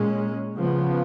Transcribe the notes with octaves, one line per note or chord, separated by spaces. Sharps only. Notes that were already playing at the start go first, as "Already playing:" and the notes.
Already playing: A#2 G#3 C#4
C#3 F3 B3